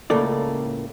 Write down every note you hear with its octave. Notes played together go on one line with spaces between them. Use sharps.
C#2 A2 C#3 A#3 A4 D5